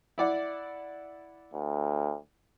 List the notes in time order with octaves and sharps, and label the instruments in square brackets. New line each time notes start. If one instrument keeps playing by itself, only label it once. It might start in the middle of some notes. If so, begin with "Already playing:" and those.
[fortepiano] E4 D5 F#5
[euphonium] D2